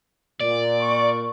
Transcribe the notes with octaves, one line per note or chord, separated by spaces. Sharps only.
A#2 D5
C#6